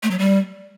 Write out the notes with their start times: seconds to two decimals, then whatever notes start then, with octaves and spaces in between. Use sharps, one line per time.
0.03 A3
0.11 F#3
0.19 G3